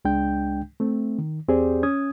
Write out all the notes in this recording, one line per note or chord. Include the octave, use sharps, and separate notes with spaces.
C#2 G#3 D4 G5 G6
A3 C4
D#3
E2 C4 G4 G#4 C5 D5
C#4 D#6 G#6